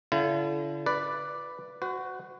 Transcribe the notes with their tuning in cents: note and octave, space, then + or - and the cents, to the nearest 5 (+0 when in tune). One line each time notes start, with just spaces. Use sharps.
D3 -35 E4 +40
B4 +0 D5 +0
F#4 +0 C5 -45